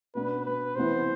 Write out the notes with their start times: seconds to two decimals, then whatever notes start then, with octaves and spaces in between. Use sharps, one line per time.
0.15 B2 B3 D4 B4
0.45 B4
0.76 C3 E3 B3 E4 C5